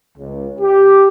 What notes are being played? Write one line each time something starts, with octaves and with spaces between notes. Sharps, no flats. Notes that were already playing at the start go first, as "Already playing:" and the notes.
C#2
G4